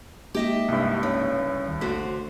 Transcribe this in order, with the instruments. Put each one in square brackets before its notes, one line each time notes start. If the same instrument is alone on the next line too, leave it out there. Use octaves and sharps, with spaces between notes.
[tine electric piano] G#3 A#3 D#4 [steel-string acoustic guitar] G4 D#5 E5
[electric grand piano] C2 G2
[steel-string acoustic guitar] C#3
[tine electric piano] D2 D#3 C#5
[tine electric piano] A1 A3 B6 [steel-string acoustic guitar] D3 F#4 C5